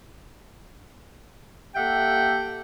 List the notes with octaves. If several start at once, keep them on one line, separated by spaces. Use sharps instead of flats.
A#3 G4 A4 E5 F#5 G5